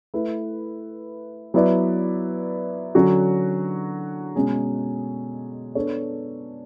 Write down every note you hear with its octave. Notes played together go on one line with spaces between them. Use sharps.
A3 E4 B4
F#3 B3 E4 B4 D5
D3 F#3 C#4 F#4
B2 G#3 C#4 G#4
B3 D4 A4 C#5